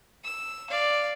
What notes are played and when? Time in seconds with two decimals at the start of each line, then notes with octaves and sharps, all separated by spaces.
0.25 E6
0.70 D5 F5